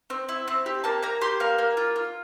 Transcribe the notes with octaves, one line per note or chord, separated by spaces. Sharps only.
C4
E4
C4
G4
A#3 A5
A#3 A#5
G4 C6
A#3 F5
A#3
F4
F4